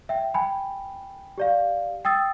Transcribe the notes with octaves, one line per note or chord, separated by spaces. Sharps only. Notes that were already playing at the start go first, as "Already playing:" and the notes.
E5 G5
G5 G#5 B5
G4 D5 F5
G5 D#6 E6 A6